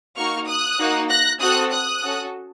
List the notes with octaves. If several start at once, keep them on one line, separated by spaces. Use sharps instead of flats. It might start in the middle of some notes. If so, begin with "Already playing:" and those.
A#3 D#4 F#4 C#6 F6
D#6 F#6
A#3 D#4 F#4
F#6 A#6
C4 F#4 A4 D#6 F#6
D#6 F#6
C#4 F#4 A4